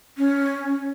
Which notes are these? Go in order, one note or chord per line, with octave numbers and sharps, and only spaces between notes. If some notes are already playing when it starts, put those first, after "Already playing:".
C#4